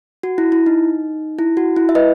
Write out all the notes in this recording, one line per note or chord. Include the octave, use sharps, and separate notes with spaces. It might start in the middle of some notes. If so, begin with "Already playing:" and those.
F#4
E4
E4
D#4
E4
F#4
E4
E5
B4 D#5